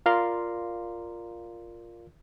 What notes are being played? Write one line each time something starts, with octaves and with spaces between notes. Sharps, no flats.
F4 A#4 D5 F5 A#5 C6